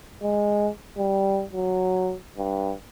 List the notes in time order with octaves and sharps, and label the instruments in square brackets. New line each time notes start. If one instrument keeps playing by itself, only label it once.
[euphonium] G#3
G3
F#3
G2